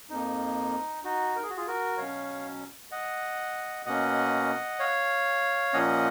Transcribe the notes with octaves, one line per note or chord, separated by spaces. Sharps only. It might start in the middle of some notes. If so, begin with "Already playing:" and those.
F2 F3 A#3 D#4
D#4 F#4
A#4
G#4
F#4
F4 G#4
F#4 A#4
B2 F#3 C#4 C#5 F5
D#5 F#5
B2 A#3 C#4 D#5 F#5
C#5 F5
A#2 F3 A#3 C#4 D#5 F#5